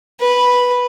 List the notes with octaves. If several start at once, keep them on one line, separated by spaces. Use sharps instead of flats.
B4